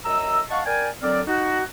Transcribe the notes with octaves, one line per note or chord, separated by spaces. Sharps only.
F#2 D#5 A#5 E6
D#5 F5 F#5 A5 C#6
A#4 D5 G5 G#5
D3 F#3 C4 A#4 D5
D#4 F#4